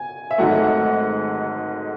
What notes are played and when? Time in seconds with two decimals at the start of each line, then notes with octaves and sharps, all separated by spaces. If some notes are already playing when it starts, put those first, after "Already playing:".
Already playing: G#5
0.31 E5
0.38 G#1 G#2 F#3 A3 F#5